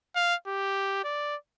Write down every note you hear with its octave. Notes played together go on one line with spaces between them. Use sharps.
F5
G4
D5